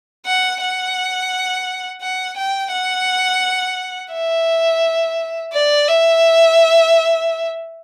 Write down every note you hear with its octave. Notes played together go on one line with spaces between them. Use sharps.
F#5
F#5
F#5
G5
F#5
E5
D5
E5